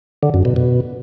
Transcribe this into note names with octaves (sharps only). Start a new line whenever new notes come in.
D3
F#2
B2
B2